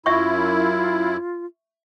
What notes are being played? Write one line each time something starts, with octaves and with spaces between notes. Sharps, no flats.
F#2 E4 F4 E5 C#6